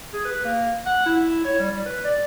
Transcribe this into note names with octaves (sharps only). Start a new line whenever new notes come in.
G#4
B4
A#3
F#5
E4
C#5
G3
G3
B4
D5